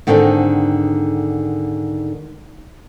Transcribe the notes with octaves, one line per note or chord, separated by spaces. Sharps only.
G#2 D3 D#3 C4 D4 A4